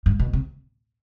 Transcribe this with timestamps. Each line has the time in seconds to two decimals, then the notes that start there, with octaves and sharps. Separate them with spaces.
0.06 G2
0.19 B2
0.33 C3